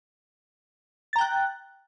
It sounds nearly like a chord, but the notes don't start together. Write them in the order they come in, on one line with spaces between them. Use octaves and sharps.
A6 A#5 G5 F#6